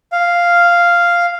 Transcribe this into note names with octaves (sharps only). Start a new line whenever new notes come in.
F5